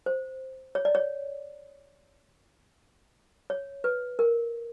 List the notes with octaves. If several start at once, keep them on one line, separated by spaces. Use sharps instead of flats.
C5
C#5
D5
C#5
C#5
B4
A#4